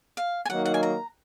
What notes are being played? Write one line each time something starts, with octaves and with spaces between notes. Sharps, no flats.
F5
G#5
D#3 F#3 A#3 D#4 F#5
F#5
G#5
A#5